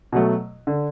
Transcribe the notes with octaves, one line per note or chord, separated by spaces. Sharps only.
B2 F#3 A3
D3